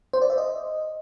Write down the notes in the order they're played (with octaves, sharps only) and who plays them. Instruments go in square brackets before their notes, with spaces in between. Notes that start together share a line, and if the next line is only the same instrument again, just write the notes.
[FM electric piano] C5
D5
E5
D#5